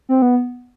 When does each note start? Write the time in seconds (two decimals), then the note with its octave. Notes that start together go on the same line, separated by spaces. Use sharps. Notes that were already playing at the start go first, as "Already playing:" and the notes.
0.09 C4
0.22 B3